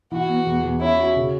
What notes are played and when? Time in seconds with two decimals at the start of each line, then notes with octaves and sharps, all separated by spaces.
0.12 E3 F#4
0.29 B3
0.46 E2
0.64 E2
0.81 C#4 E4
0.99 F#4
1.16 C#3